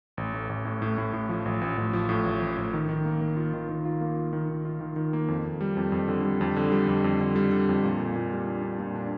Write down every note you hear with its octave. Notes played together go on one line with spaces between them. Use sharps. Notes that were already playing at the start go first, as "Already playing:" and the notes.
A1
A2
A1
A2
A2
A2
A2
F3
A1
A1
A1
F3
A2
A1
A1
A2
D#3
D#3
A#3
A#3
F4
D#3
D#3
F4
A#3
F4
D#3
D#3
F4
D#3
D#3
A#3
F2
F2
G3
F2
F2
D3
G3
F2
D3
G3
F2
F2
D3
G3
D3
F2
A#2
A#2
A#2
G3
D4
D4
A#2
D4